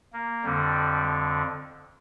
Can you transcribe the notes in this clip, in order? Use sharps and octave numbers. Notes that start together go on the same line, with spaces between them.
A#3
F2 D3 G3